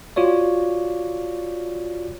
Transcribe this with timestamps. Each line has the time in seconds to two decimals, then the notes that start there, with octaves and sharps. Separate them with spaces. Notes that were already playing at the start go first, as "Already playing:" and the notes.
0.16 F4 F#4 C#5 D5